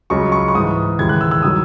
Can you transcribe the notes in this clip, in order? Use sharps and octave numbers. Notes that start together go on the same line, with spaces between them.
C#2 C#3 F#3 C#6
C#6
C#6
G#2 E3 D#6
D#2 C#3 E3 G#6
F#6
E6
E6
D#3 F#3 D#6